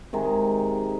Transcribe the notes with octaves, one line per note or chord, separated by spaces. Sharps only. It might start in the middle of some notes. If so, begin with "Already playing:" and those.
C3 D#3 G#3